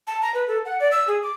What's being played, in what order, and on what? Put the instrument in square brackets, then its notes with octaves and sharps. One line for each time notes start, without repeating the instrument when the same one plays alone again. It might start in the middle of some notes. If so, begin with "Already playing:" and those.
[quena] A5
A#5
B4
A4
F#5
D5
E6
G#4
D6